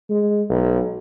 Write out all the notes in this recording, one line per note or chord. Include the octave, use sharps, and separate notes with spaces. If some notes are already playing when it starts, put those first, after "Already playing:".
G#3
B1